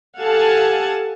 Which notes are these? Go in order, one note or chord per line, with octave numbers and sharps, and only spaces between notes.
G4 A4 F5 F#5 G#5 A5